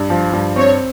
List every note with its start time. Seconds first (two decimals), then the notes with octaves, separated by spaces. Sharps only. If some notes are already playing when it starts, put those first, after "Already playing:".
Already playing: G2
0.10 F3
0.33 G2
0.56 C4 C#5